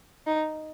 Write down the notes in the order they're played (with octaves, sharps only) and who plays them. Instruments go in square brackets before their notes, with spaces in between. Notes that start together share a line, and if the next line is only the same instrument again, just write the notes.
[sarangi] D#4